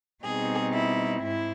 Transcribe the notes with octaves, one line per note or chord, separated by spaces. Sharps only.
B2 G3 C4 D#4 G#4
E4
G#2 G#3 E4